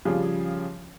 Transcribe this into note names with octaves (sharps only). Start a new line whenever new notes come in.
C#3 F3 G3 F4 G#4